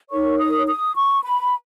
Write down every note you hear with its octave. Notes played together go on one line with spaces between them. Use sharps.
D#4 A#4 C#5 C#6
D#6
D#6
C#6
B5